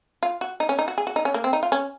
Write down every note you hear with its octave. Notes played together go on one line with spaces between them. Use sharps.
F4
F#4
D#4
C#4
D#4
F#4
G#4
F#4
D#4
C#4
A#3
C4
D#4
F4
C#4